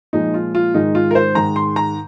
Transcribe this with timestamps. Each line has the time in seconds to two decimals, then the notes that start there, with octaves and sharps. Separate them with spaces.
0.13 A#2 F3 G#3 D#4
0.34 F4
0.55 F4
0.74 G#2 D#3 G#3 D#4
0.95 F4
1.11 A#4
1.15 C5
1.35 G#2 D#3 G#3 A#5
1.56 C6
1.76 A#5